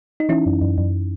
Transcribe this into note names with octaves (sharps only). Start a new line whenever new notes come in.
D#4
E3 C#4 E4
F#2
F#2
F#2